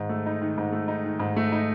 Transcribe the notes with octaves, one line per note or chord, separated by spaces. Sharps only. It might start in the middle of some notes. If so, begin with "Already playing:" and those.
Already playing: G#2 D#3
A3
D#4
D#3
G#2
A3
D#4
D#3
G#2
A3
D#4